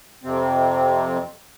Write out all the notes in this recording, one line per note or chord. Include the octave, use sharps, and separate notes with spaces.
F2 C3 C4